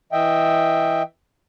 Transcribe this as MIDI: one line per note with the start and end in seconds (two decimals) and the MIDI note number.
0.12 1.02 52
0.12 1.02 75
0.12 1.02 76
0.12 1.02 79